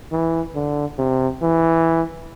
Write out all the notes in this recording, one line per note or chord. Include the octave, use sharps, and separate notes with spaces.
E3
D3
C3
E3